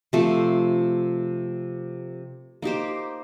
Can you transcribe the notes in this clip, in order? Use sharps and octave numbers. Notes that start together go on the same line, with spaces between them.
C3 F3 A3
A#3 D#4 G4 C5